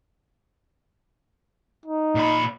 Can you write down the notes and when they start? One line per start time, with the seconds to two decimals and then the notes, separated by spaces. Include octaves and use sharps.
1.85 D#4
2.15 A#2 B5